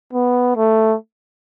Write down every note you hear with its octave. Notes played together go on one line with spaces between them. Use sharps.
B3
A3